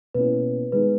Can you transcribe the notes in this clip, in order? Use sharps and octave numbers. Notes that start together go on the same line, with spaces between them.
B2 A#3 C#4 E4 B4
D#3 G#3 B3 D#4 B4